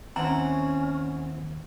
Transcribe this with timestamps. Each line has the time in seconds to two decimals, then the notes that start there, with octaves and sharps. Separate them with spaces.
0.16 D#2 E3 C4 C#4 F#5 A#5